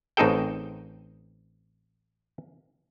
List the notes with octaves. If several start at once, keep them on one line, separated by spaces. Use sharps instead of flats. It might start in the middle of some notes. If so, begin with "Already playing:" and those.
A1 C4 D#4 G#4 A4 G5